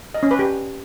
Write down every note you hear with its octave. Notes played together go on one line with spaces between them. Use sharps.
D#5
C#4
B4
G4